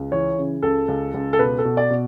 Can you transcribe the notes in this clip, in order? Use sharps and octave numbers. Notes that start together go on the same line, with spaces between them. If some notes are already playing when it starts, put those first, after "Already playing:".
Already playing: C#2
E3 C#5
C#3
C#2 A4
C#2
C#2
A4
B2 B4
A4
B2
D5
B2